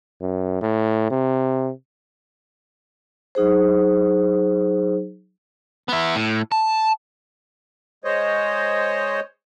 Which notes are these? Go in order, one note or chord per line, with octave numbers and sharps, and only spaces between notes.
F#2
A2
C3
F#3 D#4 G#4 C5
B3 E4
A2
A5
G#3 C5 C#5 D#5